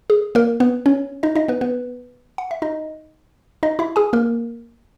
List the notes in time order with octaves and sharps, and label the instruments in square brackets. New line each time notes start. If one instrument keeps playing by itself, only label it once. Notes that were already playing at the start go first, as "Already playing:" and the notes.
[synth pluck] G#4
A#3 A#4
B3 B4
C#4 C#5
D#4 D#5
D#4 D#5
B3 B4
B3 B4
F#5
E5
D#4 D#5
D#4 D#5
E4 E5
G#4 G#5
A#3 A#4